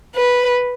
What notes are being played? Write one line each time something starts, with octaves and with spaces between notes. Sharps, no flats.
B4